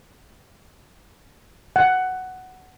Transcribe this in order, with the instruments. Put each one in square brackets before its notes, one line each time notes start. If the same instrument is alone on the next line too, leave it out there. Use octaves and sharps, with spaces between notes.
[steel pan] F#5